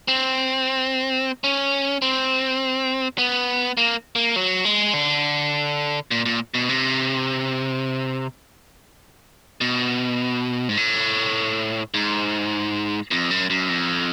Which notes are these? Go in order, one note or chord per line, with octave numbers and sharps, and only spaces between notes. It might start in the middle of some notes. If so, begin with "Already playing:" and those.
C4
C#4
C4
B3
A#3
A#3
F#3
G#3
D3
A#2
A#2
B2
C3
B2
G#2
A2
G#2
F2
F#2
F#2
F2